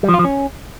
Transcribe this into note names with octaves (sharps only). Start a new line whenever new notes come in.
G3
F3
F4
F3
C#4